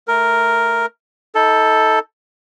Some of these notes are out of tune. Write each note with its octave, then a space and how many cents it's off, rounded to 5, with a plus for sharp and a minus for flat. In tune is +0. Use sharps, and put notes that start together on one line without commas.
A3 +0 A#4 +0
D#4 +30 A4 +0